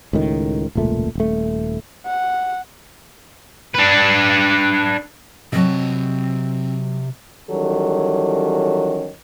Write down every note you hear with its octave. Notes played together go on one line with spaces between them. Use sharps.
C#2 A2 D#3
E1 C#2 A#2 A3
D#1 A3
F#5
D4 B4
C3 F#3 C4 D#5 A5
D#3 E3 F#3 G3 C#4 A4